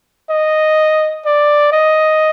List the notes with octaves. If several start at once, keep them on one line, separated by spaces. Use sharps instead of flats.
D#5
D5
D#5